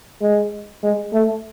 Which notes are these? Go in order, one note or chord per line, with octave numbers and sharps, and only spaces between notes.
G#3
G#3
A3